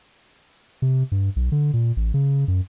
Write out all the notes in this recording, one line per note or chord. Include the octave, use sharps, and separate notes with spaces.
C3
G2
B1
D3
A#2
A1
C#3
F#2